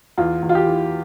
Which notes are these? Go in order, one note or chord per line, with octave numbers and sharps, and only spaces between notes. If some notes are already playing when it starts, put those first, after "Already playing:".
E2 F4
E2
F4
G4
E3